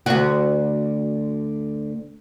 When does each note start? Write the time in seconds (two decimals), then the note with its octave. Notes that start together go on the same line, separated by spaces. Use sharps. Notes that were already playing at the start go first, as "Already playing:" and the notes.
0.06 D2 F#4